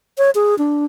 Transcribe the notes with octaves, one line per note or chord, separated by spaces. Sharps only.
C#5
G#4
D4